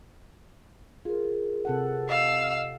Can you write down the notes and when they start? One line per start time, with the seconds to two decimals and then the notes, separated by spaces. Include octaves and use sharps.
1.05 F4 G#4 A#4
1.65 C3 A4 F#5
2.09 D#5 F5 E6